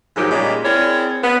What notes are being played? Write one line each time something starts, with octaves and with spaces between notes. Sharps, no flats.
G#2 D#3 F3 F#3 G4 G#4
A#2 C#3 G3 G#3
C4 E4 G#4 A#4 C#5 D5
B3